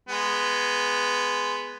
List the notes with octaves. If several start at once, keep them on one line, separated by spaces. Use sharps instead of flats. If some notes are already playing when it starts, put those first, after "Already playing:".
G#3 B3